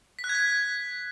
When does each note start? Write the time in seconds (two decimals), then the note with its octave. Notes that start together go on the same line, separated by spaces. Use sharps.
0.19 B6
0.24 F#6
0.29 G#6
0.35 B6